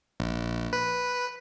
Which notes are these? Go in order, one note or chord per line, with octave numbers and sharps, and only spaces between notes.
A#1
B4